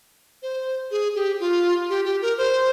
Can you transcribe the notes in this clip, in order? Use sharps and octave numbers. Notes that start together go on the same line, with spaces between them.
C5
G#4
G4
F4
G4
G4
A#4
C5